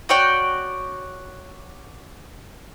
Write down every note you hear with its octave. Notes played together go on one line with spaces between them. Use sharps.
F#4 C#5 D5 G5